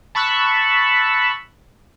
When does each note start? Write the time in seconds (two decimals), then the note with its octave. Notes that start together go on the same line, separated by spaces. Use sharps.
0.15 A5 B5 C#6 E6 F#6